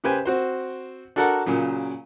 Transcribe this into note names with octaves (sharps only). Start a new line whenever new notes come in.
C#3 G4 B4 C5 G5 G#5
C4 F#4 C5
D4 F#4 A4 A#4 F#5
A#2 C#3 F#3